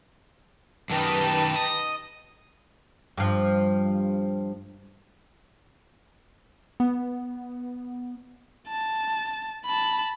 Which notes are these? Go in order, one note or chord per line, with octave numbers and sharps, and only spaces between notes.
F#2 D#3 D#4 G4 B4 A5
D#5
G2 F3
B3
A5
A5 B5